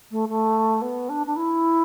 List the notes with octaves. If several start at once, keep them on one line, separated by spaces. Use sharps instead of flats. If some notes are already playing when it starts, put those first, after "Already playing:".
A3
A3
B3
D4
D4
E4